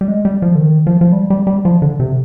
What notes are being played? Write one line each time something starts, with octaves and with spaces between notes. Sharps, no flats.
G3
G#3
G3
F3
D3
D#3
F3
F3
G3
G3
G3
F3
D3
C3